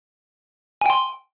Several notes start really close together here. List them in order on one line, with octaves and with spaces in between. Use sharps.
G#5 G5 C6